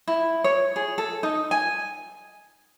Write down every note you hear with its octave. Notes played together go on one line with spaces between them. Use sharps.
E4
C#5
G#4
A4
D#4
G#5